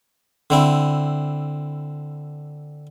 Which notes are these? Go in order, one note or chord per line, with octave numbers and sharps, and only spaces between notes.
D3 C4 E4